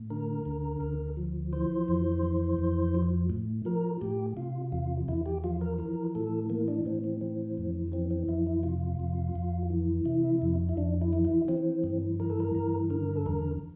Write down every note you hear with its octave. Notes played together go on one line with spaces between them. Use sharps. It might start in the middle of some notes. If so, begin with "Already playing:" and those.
Already playing: A2
D3 A#4
D2
D2
F3
E3 C5
F2
E3
F2
F3
A2
F3 A#4
A2 G4
C3 F4
E2 F4
E2 E4
G4
F3 F4
A#4
E3 A#4
A2 A4
E3 A#3
D4
A2 C4
C4
E3 C4
F2
E3 C4
C4
F2 E4
E4
C3 F4
F2
F2
E3
C3 E4
F2
E4
F2 D4
E4
E3
E4
E3 C4
G2
E3 A#4
A4
A#4
G2
D3 A#4
A4
E2 A#4